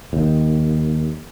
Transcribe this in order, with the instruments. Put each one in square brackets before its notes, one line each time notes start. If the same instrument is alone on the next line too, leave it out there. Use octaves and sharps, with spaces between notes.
[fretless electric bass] D#2